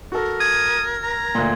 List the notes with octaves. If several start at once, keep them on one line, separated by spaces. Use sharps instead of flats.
F#4 A4 A#4
D#6 G#6
A#5
D2 A#2